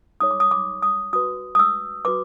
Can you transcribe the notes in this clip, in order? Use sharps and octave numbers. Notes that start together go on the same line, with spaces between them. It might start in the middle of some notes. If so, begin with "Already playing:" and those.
D#4 G#4 C#5 D#6
D6
D#6
D6
D#6
F#4 B4 D#6
D#6
E6
F#4 B4 D6